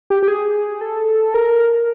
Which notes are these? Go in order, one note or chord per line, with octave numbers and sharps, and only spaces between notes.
G4
G4
G#4
A4
A#4